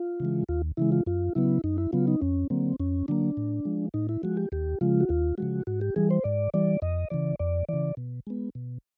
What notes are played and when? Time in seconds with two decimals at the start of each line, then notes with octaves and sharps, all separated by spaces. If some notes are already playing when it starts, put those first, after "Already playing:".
Already playing: F4
0.20 C#3 E3 G#3
0.49 D#2 F4
0.77 C#3 E3 G#3 E4
0.92 F4
1.06 F#2 F4
1.35 C#3 F#3 B3 E4
1.64 F#2 D#4
1.78 E4
1.93 C#3 F#3 B3 F4
2.08 D#4
2.21 F2 C#4
2.50 D3 F#3 A#3 C4
2.80 F2 C#4
3.08 D3 F#3 A#3 D4
3.37 A2
3.65 F3 G#3
3.94 A2 D#4
4.09 E4
4.23 F3 G#3 F#4
4.37 G4
4.52 D#2 G4
4.81 C#3 F3 G#3 F4
5.00 F#4
5.09 D#2 F4
5.38 C#3 F3 G#3 F#4
5.67 G#2 F#4
5.81 G4
5.96 E3 G3 G#4
6.11 C5
6.24 G#2 D5
6.54 E3 G3 D5
6.82 F2 D#5
7.10 C#3 E3 D5
7.39 F2 D5
7.69 C#3 E3 D5
7.97 B2
8.27 G#3 B3
8.55 B2